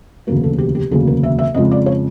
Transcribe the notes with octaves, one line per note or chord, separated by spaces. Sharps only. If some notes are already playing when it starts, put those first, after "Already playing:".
E1 D2 C#3 F#3 A#3 A#4
A4
G4
G4
E1 D2 C#3 F#3 A#3 G#4
A#4
E5
E5
F2 C#3 F3 G#3 D#5
D5
C#5